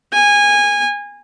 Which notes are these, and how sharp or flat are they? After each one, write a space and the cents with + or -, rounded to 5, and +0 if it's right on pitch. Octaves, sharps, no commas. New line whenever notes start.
G#5 -20